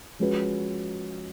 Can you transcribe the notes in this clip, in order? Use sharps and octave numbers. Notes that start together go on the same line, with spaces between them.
F3 G#3 C#4 F#4 B4